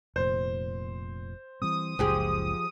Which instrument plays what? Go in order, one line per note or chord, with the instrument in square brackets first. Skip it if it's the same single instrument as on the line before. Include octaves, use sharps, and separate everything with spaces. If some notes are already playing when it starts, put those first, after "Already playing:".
[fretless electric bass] F1 A#2 [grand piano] C5
[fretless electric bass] E3 G3 C4 [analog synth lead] D#6
[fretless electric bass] F#1 C#2 [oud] F3 G4 G#4